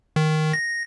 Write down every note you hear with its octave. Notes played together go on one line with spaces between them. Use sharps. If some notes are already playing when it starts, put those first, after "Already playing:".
D#3
A#6